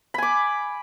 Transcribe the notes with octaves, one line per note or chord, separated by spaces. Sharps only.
G#5 B5 D6